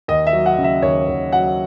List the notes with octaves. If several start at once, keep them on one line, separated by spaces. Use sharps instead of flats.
D#2 D#5
E5
F#3
F#5
C#3
E5
D#2 C#5
D#2
F#3 F#5